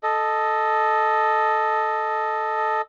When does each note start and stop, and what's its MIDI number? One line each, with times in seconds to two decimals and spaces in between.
0.03 2.81 69
0.03 2.81 75